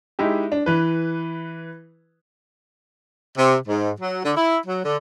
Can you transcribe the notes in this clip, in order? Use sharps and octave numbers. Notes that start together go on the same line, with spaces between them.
G#3 D#4 E4 G4
D4
E3 B4
C3
G#2
F#3
D3
E4
F#3
D3